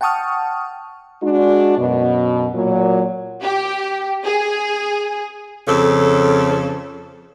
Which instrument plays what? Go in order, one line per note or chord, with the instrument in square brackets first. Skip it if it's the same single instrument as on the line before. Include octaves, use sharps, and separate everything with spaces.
[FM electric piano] F#5 G5 A5 C#6 D#6 F6
[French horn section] G#3 D4 F#4
F#2 B2
A#2 F#3
[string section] G4
G#4
[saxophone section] F2 C#3 A4